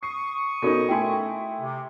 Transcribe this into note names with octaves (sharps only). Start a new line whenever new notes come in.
C#6 D#6 C7
B2 C#4 D#4 F#4 A4 A#4
A3 E4 G5 G#5 C6
C3